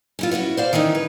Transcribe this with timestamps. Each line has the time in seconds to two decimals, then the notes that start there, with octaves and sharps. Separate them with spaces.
0.19 C#4 E4 F4
0.31 B3 C#4 E4 F#4
0.57 C5 D5 F5
0.73 D#3 E3 C#4 D#4
0.95 B4